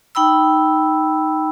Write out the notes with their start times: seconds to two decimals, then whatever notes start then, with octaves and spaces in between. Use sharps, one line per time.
0.15 D#4 G5 B5 E6